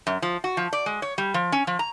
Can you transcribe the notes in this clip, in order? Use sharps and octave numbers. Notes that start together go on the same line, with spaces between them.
F#2
F3
F#4
F3
D5
G#3
C#5
G3
F3
C#4
F3
A#5